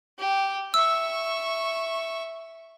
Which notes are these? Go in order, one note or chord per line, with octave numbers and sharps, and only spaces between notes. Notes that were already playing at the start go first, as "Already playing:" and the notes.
G4
E5 C#6 E6